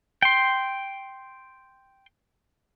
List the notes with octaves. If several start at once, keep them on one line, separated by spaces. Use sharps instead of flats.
G5 C6